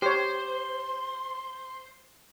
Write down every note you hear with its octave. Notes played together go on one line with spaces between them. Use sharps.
G4 C5 C#5 C6